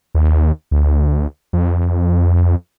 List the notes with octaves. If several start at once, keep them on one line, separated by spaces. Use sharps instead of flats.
D#2
D2
F2